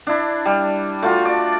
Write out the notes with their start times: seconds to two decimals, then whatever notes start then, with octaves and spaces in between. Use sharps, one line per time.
0.07 D4 E4
0.45 G3
1.02 A3 F4 F#4
1.25 D5